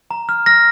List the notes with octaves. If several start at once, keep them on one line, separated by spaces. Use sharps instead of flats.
A#5
F6
F6 A#6